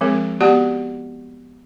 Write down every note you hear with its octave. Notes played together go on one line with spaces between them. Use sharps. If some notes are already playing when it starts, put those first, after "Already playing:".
F3 G#3 C4 G#4 A#4
B3 F#4 G4 D5 F#5 A5